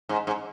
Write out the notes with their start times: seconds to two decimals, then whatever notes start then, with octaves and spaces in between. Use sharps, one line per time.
0.09 G#2
0.27 G#2